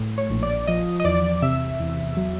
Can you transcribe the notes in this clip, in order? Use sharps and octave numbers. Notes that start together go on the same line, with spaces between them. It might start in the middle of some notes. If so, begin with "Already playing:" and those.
Already playing: A2
C#5
A#1
D5
F3 D#5
D#5
E2 D5
C3 E5
E2
F#3